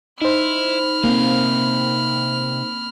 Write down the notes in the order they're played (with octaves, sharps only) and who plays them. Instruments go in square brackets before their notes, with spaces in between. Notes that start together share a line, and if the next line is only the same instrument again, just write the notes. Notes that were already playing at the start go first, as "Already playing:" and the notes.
[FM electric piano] D#4 C5 [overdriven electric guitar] E4 [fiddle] B5 F6
[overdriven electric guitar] C3 F5 [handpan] A#3 C4